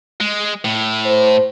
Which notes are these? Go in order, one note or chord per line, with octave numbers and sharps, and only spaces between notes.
G#3
A2
C5